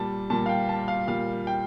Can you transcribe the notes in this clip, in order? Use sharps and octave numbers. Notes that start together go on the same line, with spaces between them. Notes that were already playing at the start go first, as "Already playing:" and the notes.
Already playing: A#2 G3 A5
A#2 G3 A5
F5
G5
A5
F5
A#2 G3 F5
G5